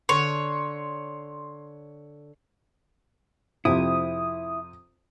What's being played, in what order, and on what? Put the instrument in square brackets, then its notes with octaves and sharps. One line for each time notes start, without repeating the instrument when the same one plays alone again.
[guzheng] D3 [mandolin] C#5 [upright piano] C6
[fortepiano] F2 C3 [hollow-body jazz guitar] E4 [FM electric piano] D#6